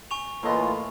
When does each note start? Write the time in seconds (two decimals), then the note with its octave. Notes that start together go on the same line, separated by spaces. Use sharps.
0.11 G#5 C#6 F7
0.43 A2 E3 A3 A#3 F4 B4 D#5